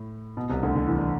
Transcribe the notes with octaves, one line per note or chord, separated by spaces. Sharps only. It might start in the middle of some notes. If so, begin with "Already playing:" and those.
Already playing: A2
B2
C2 C3
D2 D3
D3
E3
D3